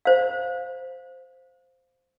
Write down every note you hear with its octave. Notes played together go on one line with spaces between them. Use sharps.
C5 F5